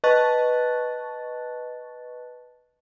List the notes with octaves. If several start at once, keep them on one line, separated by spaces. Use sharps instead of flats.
B4 D#5 A5 C#6 F#6 A6